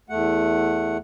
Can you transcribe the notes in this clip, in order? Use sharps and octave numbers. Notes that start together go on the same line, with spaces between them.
E2 A3 F#5